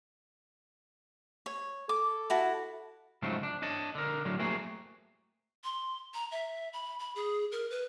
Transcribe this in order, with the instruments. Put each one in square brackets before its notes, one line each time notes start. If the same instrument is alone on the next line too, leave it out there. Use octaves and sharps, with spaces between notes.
[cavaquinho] C#5
[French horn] A4 [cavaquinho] D6
[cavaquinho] E4 F#4 A5
[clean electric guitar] G#2 C#3 F3 F#3 A3 C4
D4
D4 C#5 D#5 A5
D3 A#4
A2 D3 F#3
A3 A#3 C4 F#4 G#4
[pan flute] C6
A#5
E5
B5
B5
G#4
A#4
B4